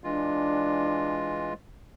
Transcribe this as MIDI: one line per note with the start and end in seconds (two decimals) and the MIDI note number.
0.04 1.53 52
0.04 1.53 56
0.04 1.50 62
0.04 1.53 65